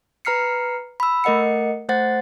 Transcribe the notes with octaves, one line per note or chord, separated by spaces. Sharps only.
B4 A#5 F6 C7 C#7
B5 E6
A3 A#4 D#5 F#5 C#7
A3 C5 F#5 A6